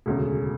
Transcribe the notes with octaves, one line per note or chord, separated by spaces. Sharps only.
E1 D2 C#3